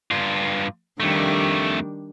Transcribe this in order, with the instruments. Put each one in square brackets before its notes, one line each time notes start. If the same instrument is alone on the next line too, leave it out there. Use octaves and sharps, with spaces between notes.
[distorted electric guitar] G2 F4
[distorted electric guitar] F2 A3 [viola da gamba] D#3 G3 D4